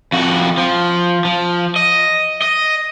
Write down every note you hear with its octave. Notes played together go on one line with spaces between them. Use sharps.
F2 F#4
F3
F3
D#5
D#5